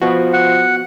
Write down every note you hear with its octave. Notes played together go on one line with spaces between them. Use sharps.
F3 B3 F#4
F#5